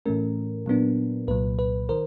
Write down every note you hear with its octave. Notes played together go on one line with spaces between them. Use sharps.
A2 E3 A3 C#4 A#4
A#2 F#3 B3 D4
C2 A#2 F#3 B4
B4
D#3 A#4 C5